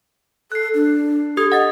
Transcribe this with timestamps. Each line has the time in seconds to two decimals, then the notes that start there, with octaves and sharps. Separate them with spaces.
0.52 A4 F#6 C7
0.74 D4
1.37 G4 A4 D#6 G#6
1.52 D#5 F#5 A6